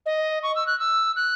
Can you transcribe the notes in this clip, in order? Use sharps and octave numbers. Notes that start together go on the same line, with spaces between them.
D#5
C#6
E6
F#6
E6
F#6